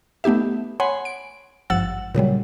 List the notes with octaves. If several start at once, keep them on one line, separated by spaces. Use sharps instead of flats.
A3 B3 D#4 G4 E5
C#5 F#5 G#5 B5 C6
D7
G#1 G2 F3 F#5 E6 A6
A#2 C#3 F#3 G3